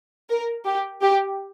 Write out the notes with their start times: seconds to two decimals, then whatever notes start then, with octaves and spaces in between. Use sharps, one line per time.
0.30 A#4
0.66 G4
1.02 G4